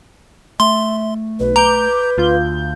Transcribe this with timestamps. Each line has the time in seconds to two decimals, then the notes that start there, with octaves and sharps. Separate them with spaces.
0.60 A3 E5 C6
1.40 B1 B4
1.56 A#5 D6 G6
2.18 D2 F4 G6